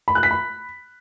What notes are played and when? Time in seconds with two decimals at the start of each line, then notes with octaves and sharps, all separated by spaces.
0.08 B5
0.15 F#6
0.23 B6
0.31 B5